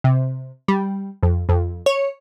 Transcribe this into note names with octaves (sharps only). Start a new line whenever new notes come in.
C3
G3
F2
F2
C#5